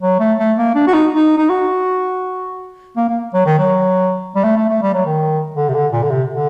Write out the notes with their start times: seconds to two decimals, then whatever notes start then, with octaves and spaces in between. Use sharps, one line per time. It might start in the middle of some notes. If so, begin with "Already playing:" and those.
0.02 F#3
0.20 A3
0.39 A3
0.57 A#3
0.75 D4
0.87 F#4
0.94 D#4
1.13 D#4
1.38 D#4
1.50 F#4
2.97 A#3
3.09 A#3
3.34 F#3
3.46 D#3
3.59 F#3
4.36 G3
4.44 A3
4.57 A3
4.69 A3
4.82 G3
4.94 F#3
5.06 D#3
5.56 D3
5.69 C3
5.74 D3
5.93 A#2
6.03 D3
6.10 C3
6.29 D3